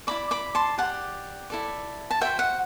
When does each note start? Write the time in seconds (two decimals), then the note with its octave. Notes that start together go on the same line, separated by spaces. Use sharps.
0.07 E4 B4 D5 B5 D6
0.31 B5 D6
0.55 A5 C6
0.78 G4 F#5 A5
0.83 D5
1.50 E4 A4 D5
2.11 A5
2.21 F#4 C5 E5 G5
2.39 F#5